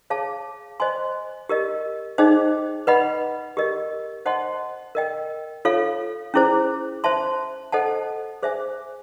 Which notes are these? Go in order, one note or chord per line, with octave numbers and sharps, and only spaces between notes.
G#4 C#5 F5 A5
C5 D#5 G#5 C6
G4 A#4 D#5
D#4 G#4 C5 D#5 G5
B4 D#5 F#5 B5
G4 A#4 D#5
C5 D#5 F#5 A5 C6
A#4 D#5 G5
F4 A4 C#5 F5
C#4 E4 G#4 C5
C5 E5 A5 C6
A4 C5 D#5 F#5 A5
G#4 C5 E5 G#5